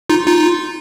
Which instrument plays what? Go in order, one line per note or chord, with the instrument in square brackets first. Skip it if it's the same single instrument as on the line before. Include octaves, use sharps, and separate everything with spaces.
[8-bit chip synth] D#4 F4
D#4 F4